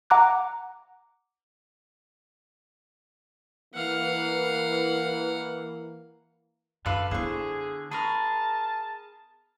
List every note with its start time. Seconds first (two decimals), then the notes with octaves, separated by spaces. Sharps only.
0.10 F#5 A#5 D6 F#6
3.74 E3 A#3 F5 F#5
6.86 F#2 D3 A4 B4 F5
7.11 D3 B3 E4 G#4 C5 C#6
7.91 G#4 A#4 A5 B5 C#6